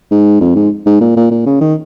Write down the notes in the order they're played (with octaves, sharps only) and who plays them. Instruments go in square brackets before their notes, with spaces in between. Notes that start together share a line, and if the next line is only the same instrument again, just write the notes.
[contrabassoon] G#2
F2
G#2
G#2
A#2
A#2
A#2
C#3
D#3